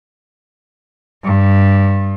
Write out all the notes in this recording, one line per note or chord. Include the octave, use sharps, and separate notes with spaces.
G2